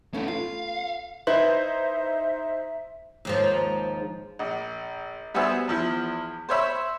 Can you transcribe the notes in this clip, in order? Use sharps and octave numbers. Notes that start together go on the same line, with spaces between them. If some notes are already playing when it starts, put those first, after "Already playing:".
A3 B3 C#4 D#4 E4
F4 F5
D#4 E4 B4 C5 E5 C6
D#2 G#2 F3
A#1
G3 B3 F#4 G#4 C5 E5
E2 F3 E4
C5 C#5 E5 B5